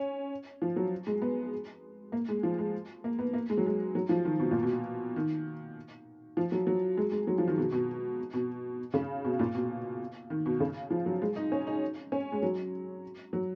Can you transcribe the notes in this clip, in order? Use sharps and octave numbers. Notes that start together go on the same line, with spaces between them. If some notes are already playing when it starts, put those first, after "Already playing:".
Already playing: C#4
F3
F#3
G#3
B3
A#3
G#3
F3
G#3
A#3
B3
A#3
G#3
F#3
G#3
F#3
F3
D#3
B2
A#2
B2
D#3
F3
F#3
F#3
G#3
G#3
F#3
F3
D#3
B2
B2
B2
C#3
B2
A#2
B2
D#3
B2
C#3
F3
F#3
G#3
D#4
C#4
D#4
C#4
G#3
F#3
F#3